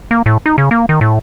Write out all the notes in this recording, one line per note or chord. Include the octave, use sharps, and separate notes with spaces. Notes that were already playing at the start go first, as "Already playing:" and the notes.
A#3
A2
D#4
C#3
A#3
D#3
A2